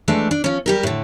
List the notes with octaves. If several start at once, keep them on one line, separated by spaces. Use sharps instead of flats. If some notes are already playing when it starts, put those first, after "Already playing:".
E3 G#3 A3 D4
D4
F3 C#4
G3 G4 A#4
A2 D3